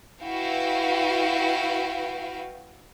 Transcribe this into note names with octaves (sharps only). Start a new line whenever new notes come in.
E4 F#4 B4 F5 G5